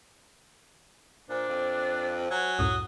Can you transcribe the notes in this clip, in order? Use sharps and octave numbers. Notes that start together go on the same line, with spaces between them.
A#2 D4 C5
F2
F#3 G#5
C#2 F#2 A2 D#6